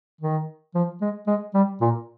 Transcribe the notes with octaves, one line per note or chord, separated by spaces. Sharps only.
D#3
F3
G#3
G#3
G3
A#2